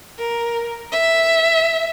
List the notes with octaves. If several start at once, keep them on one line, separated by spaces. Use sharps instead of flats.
A#4
E5